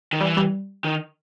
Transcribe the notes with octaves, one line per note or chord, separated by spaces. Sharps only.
D#3
E3 G3
G3
D#3